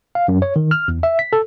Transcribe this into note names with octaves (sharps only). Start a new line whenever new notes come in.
F5
F#2
C#5
D#3
F6
E2
E5
B6
A4